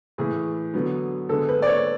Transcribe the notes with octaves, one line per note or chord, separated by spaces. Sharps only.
A2 E3 A3 G#4
D3 F#3 B3
D3 G#3 B3 A4
B4
D5
C#5